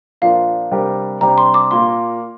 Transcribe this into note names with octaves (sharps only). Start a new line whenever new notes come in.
A#2 F3 D4 F4 A#4 F5
C3 G3 D4 G4 A#4
C3 G3 D4 G4 A#5
C6
D6
A#2 A#3 F4 A#4 C6